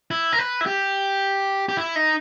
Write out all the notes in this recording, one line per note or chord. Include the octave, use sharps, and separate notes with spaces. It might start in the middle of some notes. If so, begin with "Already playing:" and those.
E4
A#4
B4
E4
G4
G4
E4
D#4